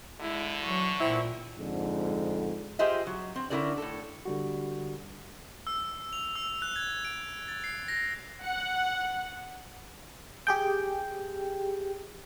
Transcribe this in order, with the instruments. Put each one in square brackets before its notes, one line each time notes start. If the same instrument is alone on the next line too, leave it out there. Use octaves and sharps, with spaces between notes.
[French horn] D3 [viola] G#3 E4
[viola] E3 C#6 [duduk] F#3
[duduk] A#2 [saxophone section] C4 E4
[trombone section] F2 G#2 D3
[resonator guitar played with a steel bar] F4 G4 G#4 C5 D#5 E5
F#3
C4
D3 C#4 E4 G#4 A#4 D5
A2 A4
[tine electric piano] D3 G3 F#4
[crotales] E6
F7
E6
F#6
G#6
D7
A6
C7
A#6
[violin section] F#5
[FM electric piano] G4 G#4 G5